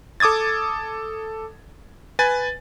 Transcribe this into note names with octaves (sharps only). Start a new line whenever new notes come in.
A4 D6 D#6 G#6 A6
B4 G#5 A6